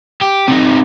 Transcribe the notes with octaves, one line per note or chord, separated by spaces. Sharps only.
G4
C3 D#4